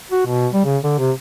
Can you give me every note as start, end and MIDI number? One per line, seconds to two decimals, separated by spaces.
0.11 0.23 66
0.27 0.48 47
0.53 0.65 55
0.65 0.78 49
0.84 0.93 50
0.98 1.11 48